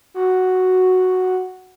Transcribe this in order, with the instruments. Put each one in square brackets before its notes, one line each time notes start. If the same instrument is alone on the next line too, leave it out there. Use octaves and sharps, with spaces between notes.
[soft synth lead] F#4